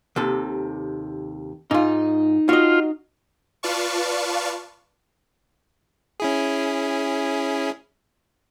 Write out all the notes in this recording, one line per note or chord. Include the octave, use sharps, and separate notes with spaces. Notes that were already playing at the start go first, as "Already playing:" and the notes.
D#2 C3 A4
G#2 D#4 F4
F4 F#4 D#5
F4 B4 D5 F5 A5 C#6
C#4 E4 G#4